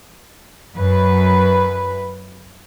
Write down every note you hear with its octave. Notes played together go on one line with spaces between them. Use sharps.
F#2 B4